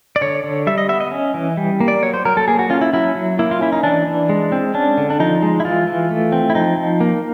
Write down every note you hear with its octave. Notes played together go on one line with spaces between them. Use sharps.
D5
D3 C#5
D3
G3 E5
D#5
B3 E5
D#5
C#4
E3
G3
A#3
D5
F#3 C#5
C5
F#3 A#4
A4
A#3 G#4
F#4
C#4 F4
E4
F#3 E4
F#3
A#3 E4
F4
C#4 E4
D#4
E3 D4
E3
G#3
C4
C#4 D4
D3
D4
F3 D#4
G#3
E4
E3 F4
E3
A3
C4
E4
F3 D#4
F3
A#3